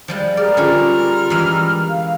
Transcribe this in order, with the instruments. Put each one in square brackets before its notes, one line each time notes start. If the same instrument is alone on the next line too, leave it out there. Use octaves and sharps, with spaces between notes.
[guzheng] F3 G3 G#3
[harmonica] G3 A#4 F6 [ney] G#4 [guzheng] D5
[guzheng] D3 C#4 G#4 [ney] F4
[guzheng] E3 G#3
[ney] F5